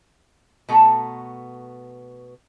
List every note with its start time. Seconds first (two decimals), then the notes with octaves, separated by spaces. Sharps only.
0.69 B2 A3 B3 A4 A#5